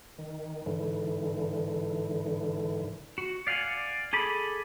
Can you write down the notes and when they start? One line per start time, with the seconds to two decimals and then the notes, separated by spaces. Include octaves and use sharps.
0.18 D#3
0.66 G#2 D3 E3
3.18 F#4
3.47 D5 F5 F#5 G#5
4.13 G#4 A4 B5 D6